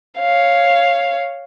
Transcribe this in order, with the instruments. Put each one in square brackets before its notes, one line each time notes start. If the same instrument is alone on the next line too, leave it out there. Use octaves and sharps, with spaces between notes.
[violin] C#5 F5